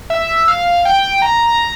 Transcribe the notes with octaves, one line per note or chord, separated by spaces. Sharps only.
E5
F5
G5
A#5